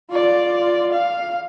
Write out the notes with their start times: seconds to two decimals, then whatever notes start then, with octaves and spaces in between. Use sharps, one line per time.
0.11 F4 D5
0.92 F5